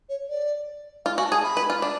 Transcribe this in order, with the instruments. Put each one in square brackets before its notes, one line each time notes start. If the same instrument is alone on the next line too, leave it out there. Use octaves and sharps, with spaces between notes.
[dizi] C#5
D5
[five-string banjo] F4 [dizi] F5
[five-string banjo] F#4 [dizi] G#5
[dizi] A5
[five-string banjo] G#4
[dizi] B5
[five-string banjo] B4
F4
D4